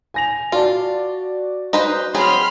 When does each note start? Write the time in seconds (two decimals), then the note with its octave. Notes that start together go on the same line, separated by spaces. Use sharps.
0.14 G#5 A#6 F7
0.52 F4 F#4 D5 A5
1.73 D#4 B4 C5
2.15 F#3 C4 G#4 B5 C6 F6